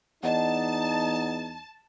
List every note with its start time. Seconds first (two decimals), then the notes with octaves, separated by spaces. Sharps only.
0.23 E2 D#4 D5 D#5 F#5 A5